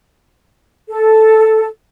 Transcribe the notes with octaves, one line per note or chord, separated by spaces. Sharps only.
A4